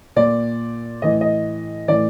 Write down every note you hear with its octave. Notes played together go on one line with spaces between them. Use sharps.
A#2 D5
A2 E3 D#5
D#5
A2 E3 D5